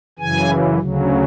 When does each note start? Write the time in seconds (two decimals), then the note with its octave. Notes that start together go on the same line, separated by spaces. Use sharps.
0.19 F#2 C#3 E3 G#5
0.79 D2 C#3 F#3